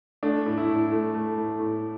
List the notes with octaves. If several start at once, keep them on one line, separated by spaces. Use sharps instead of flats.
A3 D4
A2
E4
A2
A3
A3
A2
A2